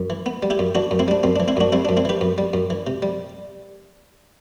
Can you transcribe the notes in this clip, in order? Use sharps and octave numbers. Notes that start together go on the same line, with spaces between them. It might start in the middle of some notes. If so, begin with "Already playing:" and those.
Already playing: F#2
E3
B3
G3
E4 G4
F#2
E3 D4 F#4
F#2
C4 E4
G3 D4
F#2 C4
D4
E3
C4 E4
F#2 D4 F#4
G3 C4 E4
D4
F#2
C4 E4
E3 G4 B4
F#2
G3
F#2
E3
C3
G3